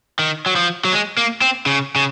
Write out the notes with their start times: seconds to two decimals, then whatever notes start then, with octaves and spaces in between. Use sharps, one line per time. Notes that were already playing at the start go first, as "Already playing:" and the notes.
0.19 D#3
0.46 F#3
0.56 F3
0.85 F#3
0.93 G#3
1.17 A#3
1.42 C4
1.66 C#3
1.96 C#3